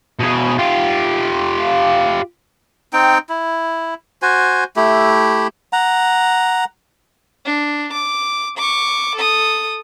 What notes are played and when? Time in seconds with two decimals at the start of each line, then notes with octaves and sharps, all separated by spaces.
0.19 B2 G#4
0.59 F4 G4
2.93 C4 D#4 G5
3.29 E4
4.22 F#4 C5 G#5
4.76 A3 E4 G4
5.73 F#5 A#5
7.45 D4
7.93 D6
8.57 C#6 D6
9.15 A4 D#6